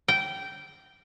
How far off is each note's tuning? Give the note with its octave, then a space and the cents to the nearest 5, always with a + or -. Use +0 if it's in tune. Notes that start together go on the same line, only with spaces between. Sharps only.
G5 -15